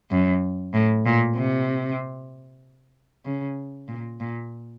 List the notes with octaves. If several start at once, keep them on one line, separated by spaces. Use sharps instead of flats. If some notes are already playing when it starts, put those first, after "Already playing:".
F#2
A2
A#2
C3
C#3
A#2
A#2